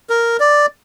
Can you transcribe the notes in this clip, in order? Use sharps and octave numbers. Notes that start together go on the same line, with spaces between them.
A#4
D5